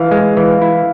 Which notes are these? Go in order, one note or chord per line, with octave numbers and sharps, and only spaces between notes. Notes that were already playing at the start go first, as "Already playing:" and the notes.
Already playing: E3 F5
G#3
E3
E4